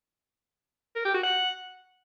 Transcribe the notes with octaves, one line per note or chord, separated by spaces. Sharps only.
A#4
G4
F#4
F#5